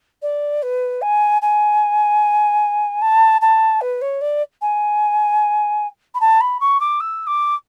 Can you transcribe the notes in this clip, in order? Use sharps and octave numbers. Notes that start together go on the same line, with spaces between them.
D5
B4
G#5
G#5
A5
A5
B4
C#5
D5
G#5
B5
A5
B5
C#6
D6
E6
D6